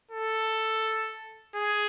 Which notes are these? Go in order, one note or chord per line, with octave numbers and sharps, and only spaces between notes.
A4
G#4